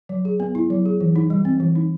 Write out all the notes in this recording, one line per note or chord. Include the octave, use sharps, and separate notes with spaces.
F#3
G#4
B3
E4
F#3
G#4
E3
D#4
G3
C4
E3
D#4